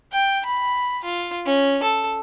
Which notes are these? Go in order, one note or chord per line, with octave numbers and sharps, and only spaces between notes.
G5
B5
F4
C#4
A4